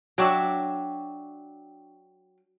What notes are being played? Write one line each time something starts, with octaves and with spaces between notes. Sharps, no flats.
F#3 D4 E5 G5 C#6 D6